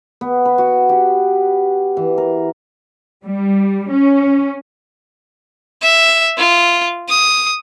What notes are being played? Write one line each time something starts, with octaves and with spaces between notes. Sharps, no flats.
B3
B4
F#4
G4
E3
A#4
G3
C#4
E5
F4
D#6